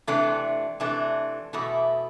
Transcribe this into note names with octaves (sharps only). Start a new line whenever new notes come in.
C3 E3 A3 D4
C3 E3 A3 D4
E2 B2 A3 E4